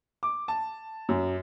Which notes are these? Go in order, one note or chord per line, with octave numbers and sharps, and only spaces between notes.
D6
A5
F#2